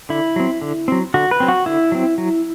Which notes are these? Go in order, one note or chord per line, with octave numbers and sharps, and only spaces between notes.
D3 E4
F#3 C4
D3
F#3 C4
D3 F#4
B4
F#3 C4
F#4
D3 E4
F#3 C4
F#3